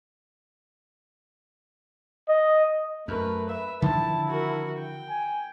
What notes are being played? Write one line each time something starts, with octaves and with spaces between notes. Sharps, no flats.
D#5
F#2 A3 A#4 B4
B4 E5
D3 D#3 F3 E4 A5
F#4 A#4
G5
G#5